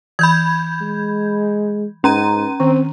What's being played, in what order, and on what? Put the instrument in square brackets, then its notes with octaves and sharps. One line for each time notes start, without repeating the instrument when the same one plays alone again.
[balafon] E3 [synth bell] B5 G6 G#6
[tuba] G#3
[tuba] G#2 [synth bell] C#4 A#5 D#7
[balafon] D#3 [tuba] C4